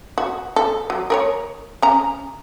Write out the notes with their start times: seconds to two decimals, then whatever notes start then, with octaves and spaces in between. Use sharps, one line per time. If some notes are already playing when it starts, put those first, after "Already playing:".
0.18 F#4
0.56 A4
0.90 F#3
1.10 A#4 B4 C#5
1.82 C#4 A#5